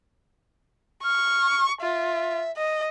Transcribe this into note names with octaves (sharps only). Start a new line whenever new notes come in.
C#6 F6
F4 E5
D#5